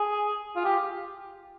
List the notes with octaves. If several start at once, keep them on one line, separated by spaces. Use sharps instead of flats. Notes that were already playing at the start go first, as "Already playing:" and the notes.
Already playing: G#4
F4
G4